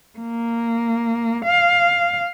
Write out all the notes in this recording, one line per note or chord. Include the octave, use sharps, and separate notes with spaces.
A#3
F5